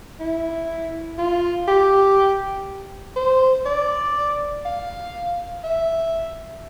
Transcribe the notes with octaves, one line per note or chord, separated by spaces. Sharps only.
E4
F4
G4
C5
D5
F5
E5